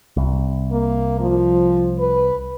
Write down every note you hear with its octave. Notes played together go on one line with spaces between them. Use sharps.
C2
A#3
F3
B4